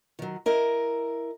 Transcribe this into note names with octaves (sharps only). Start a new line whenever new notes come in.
D#3 F#3
E4 A#4 D#5